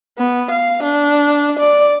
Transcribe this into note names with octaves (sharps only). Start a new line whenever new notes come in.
B3
F5
D4
D5